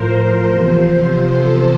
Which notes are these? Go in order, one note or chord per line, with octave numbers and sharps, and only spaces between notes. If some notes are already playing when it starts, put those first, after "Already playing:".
Already playing: A2 F3 A#4 C5
E2 C3 F3 C5
A4